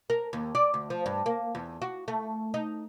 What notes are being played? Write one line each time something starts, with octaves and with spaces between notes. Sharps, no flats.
A#4
D#2
D5
D2
F3
G2
A#3
E2
F#4
A3
D#4